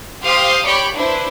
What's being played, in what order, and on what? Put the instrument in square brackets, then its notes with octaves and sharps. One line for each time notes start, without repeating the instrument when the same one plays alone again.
[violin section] G4 C5 F5 C6 D#6
G4 C#5 D5 G5 B5
D4 E4 B4 C5